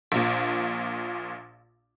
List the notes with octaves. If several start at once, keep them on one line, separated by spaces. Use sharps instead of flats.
A#1 A#2